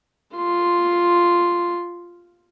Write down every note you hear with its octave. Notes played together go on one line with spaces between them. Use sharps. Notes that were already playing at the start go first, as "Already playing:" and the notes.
F4 C6